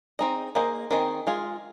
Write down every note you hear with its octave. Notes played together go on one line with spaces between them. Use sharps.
C4 D#4 G#4 D#5
A#3 G#4 C5 D#5
D#3 C4 G#4 D#5
G#3 F4 G#4